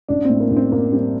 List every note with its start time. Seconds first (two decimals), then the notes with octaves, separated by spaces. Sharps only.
0.09 A1 D4
0.25 A2 C4
0.40 A#3
0.51 A1
0.57 C4
0.72 A1 A#3
0.93 G3 C4